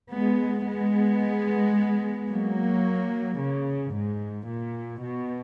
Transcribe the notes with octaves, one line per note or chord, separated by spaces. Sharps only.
G#3 B3
G#3 B3
F#3 A#3
C#3
G#2
A#2
B2